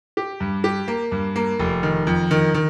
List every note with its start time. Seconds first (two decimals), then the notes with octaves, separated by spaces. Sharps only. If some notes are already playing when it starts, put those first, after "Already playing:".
0.17 G4
0.40 G2
0.64 G4
0.88 A#3
1.12 G2
1.36 A#3
1.59 F1
1.83 D#3
2.07 F2
2.31 D#3
2.54 D#3